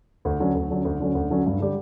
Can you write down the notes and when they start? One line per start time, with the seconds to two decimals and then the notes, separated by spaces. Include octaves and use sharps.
0.25 D2
0.40 D3 F#3 C#4
0.55 D2
0.70 D3 F#3 C#4
0.85 D2
1.00 D3 F#3 C#4
1.15 D2
1.30 D3 F#3 C#4
1.46 G2
1.60 D3 G3